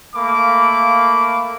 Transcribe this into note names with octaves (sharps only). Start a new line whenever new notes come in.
A3 A#3 F5 B5 D6